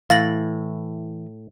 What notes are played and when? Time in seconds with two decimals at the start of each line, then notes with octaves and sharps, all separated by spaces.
0.10 A2 E3 F5 A6 A#6 F#7